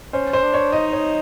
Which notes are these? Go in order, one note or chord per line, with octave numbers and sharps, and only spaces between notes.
C#4 C5
C5
D4
C#5
D#4 D#5
C#5